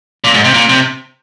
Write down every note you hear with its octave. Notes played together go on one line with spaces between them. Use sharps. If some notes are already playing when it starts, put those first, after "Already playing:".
A#2
G#2
C3
A#2
C3